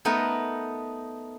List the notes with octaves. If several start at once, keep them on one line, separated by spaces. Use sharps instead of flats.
A3 B3 D#4 A#4